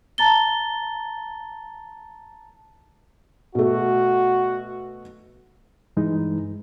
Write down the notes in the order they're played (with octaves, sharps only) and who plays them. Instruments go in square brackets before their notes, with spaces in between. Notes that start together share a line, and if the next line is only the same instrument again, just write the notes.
[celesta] A5 A#5 A6 G7
[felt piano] B2 A3 [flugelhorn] F#4
[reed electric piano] G2 E3 G#3 D#4